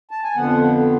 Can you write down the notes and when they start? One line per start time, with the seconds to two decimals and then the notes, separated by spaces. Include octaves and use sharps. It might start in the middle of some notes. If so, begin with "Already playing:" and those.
0.11 A5
0.23 G#5
0.36 F2 D3 F3 B3 F#5